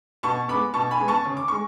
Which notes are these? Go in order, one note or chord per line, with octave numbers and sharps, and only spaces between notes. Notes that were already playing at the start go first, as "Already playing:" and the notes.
B2 A5 C#6
G#3 B3 B5 D6
B2 A5 C#6
G#5 B5
G#3 B3
A5 C#6
C#3
D6
G#3 C#6